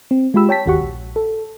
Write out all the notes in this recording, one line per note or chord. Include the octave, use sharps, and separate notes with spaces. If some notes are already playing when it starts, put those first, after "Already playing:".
C4
G#3 F4 G4 B5 E6
C#5 G5 A5 B6
G1 D#2 F#4 G4 F#5 C#6
A#1
A4